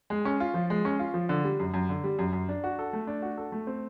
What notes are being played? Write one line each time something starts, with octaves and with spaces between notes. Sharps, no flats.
G#3
C#4
F4
F3
G#3
C#4
F4
F3
D3
G3
F#2
F#2
D3
G3
F#2
F#2
D4
F#4
A4
A3
D4
F#4
A4
A3
C4